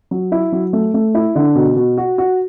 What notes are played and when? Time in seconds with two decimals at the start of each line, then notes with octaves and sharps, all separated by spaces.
0.11 F#3
0.32 E4
0.52 F#3
0.73 A3
0.94 A3
1.15 E4
1.35 D3
1.55 B2
1.76 B2
1.98 F#4
2.18 F#4